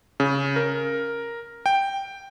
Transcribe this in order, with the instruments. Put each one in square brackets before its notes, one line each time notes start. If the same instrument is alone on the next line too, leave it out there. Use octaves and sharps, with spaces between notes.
[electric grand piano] C#3
A#4
G5